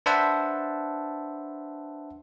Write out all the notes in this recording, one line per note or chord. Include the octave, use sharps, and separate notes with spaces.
D4 B4 C5 E5 F#5 A5